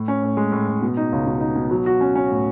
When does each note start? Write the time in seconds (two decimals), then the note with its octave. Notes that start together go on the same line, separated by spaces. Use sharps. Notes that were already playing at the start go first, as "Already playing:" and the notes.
Already playing: A2
0.08 C#4
0.23 A2
0.37 G#3
0.52 A2
0.68 A2
0.82 B2
0.97 D#4
1.12 C#2
1.27 B2
1.41 D#4
1.56 B2
1.71 F#3
1.86 F#4
2.01 C#4
2.15 C#4
2.31 A2